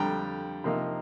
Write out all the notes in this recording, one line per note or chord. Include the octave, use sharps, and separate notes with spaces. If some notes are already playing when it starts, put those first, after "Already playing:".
Already playing: F2 D3 G3 G5 A#5
C3 F3 A#3 D#4